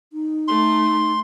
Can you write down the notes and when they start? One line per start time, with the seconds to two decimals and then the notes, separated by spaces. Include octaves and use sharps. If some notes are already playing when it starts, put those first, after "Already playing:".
0.13 D#4
0.48 A3 C6